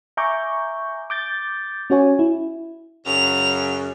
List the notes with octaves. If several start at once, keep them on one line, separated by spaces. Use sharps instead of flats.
E5 G#5 A#5 C#6 D6 G6
D6 G6 A6
C#4 F#4 C#5 G#5
E4
F#2 C#3 F7